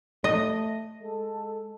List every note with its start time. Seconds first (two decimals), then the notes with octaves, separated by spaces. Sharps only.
0.24 A3 D#5
1.02 G#3 A4